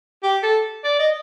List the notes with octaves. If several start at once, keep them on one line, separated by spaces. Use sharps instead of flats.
G4
A4
D5
D#5